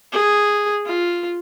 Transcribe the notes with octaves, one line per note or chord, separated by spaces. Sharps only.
G#4
F4